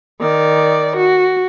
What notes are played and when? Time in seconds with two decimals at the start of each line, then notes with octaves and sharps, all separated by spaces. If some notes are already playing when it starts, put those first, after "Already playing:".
0.20 D#3 D5
0.96 F#4